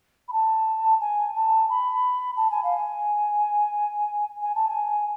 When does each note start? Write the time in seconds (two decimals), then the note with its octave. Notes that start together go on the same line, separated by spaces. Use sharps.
0.28 B5
0.33 A5
1.01 G#5
1.35 A5
1.70 B5
2.37 A5
2.51 G#5
2.64 F5
2.77 G#5
4.42 G#5
4.55 A5
4.69 G#5